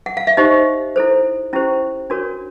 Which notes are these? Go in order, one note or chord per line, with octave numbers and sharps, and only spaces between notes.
F#5
F5
E5
D#4 G4 C5 D#5
E4 A4 C5
C#4 E4 G4 C5
D4 F#4 A#4 C#5